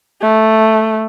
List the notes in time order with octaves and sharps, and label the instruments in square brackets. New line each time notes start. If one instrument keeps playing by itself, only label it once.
[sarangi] A3